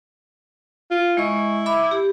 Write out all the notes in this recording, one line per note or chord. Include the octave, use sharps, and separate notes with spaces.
F4
G#3 E4 D#5 C#6
E5 B5 D6
G4